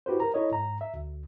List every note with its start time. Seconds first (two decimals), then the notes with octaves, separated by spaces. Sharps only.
0.06 E4 F#4 G4 B4 C5
0.20 A#4 A#5
0.34 E4 A4 C#5 D#5
0.52 G#2 A#5
0.81 E5
0.94 D2